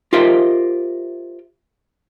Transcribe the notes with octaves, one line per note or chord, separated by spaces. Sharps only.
F4 G4 A#4 C5 D#5 E5